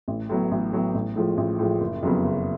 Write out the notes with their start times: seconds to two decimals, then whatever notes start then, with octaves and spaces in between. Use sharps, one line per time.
0.08 A1
0.29 A2 F#3 B3
0.51 A1
0.72 A2 F#3 B3
0.95 A1
1.16 A2 F3 G#3
1.37 A1
1.59 A2 F3 G#3
1.80 F#1
2.03 F2 C#3 F#3 B3
2.24 F#1